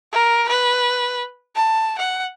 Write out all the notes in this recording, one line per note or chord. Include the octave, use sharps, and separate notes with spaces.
A#4
B4
A5
F#5